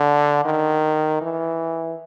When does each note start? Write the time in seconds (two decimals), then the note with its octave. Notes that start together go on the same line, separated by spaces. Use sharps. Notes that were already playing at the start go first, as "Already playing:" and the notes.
Already playing: D3
0.45 D#3
1.21 E3